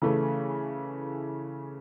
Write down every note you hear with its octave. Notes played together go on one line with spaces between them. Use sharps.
C#3 E3 A3